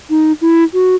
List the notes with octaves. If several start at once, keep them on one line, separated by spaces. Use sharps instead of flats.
D#4
E4
F#4